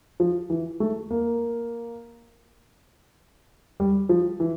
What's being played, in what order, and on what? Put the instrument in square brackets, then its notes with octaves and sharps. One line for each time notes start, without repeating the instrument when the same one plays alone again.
[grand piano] F3
E3
A3
A#3
G3
F3
E3